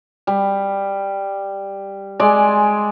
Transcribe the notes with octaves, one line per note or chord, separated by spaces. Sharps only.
G3
G#3 D5 G#5